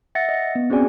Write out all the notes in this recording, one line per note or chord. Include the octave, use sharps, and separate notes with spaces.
E5 F#5 A6 A#6 C#7
D#5
B3
C4 C#4 F#4 G#4 D5 G#5